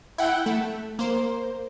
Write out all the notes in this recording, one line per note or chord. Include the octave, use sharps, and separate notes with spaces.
E4 F#5 G5
A3
A#3 C5